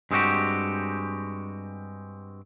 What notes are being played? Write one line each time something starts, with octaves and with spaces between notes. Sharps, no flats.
G2 G#3 C4 C#4 F#4 G4